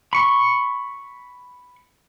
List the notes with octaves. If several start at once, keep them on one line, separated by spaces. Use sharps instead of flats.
B5 C#6